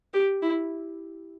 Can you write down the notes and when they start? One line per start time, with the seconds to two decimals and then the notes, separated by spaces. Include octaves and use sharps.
0.14 G4
0.42 E4